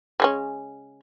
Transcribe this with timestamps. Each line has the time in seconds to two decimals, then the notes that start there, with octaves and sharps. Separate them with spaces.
0.20 C#3 G#3 C#4